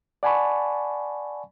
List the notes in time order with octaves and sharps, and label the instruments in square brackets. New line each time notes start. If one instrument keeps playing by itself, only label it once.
[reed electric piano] D5 F#5 G#5 A5 B5 C#6